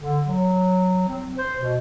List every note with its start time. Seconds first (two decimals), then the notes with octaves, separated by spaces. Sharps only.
0.02 D3
0.26 F#3
1.08 C4
1.38 C5
1.60 B2